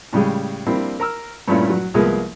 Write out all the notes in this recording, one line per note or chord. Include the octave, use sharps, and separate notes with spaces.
A2 C#3 G3 G#3
G3 A#3 C4 D4 E4
A#4 A#5 E6 F6
G2 A#2 A3 C#4 E4 F4
F#3
C2 F3 G#3 A#3 B3 G#4